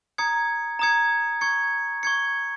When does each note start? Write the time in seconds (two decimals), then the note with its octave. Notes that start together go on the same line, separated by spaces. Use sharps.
0.18 A#5 D#6 G#6 C#7
0.79 A#5 D#6 G#6 C#7
1.41 C#6 G#6 C#7
2.03 C#6 G#6 C#7